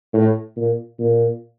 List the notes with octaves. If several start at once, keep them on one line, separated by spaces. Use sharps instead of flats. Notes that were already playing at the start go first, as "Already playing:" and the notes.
A2
A#2
A#2